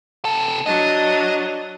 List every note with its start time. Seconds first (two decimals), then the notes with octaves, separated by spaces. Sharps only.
0.25 C3 A4
0.66 F#3 D4 D#5